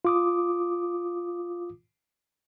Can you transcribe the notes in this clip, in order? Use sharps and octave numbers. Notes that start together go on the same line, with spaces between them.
F4 D6 D#6